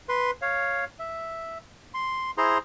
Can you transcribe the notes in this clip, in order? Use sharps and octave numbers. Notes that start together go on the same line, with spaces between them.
B4 C6
C#5 F5
E5
C6
E4 G#4 C5 A#5 C6